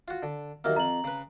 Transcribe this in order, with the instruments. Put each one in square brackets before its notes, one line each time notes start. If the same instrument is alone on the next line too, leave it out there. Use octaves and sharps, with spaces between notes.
[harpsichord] F4 F#4
D3
[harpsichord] D#2 F#3 A#3 [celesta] E5 F6
[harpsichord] F2 [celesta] A#5 F#7
[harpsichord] C#3 B4